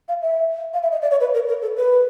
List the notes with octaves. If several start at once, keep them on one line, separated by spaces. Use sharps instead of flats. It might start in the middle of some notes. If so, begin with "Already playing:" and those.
F5
E5
F5
E5
D#5
D5
C#5
B4
A#4
A#4
A4
B4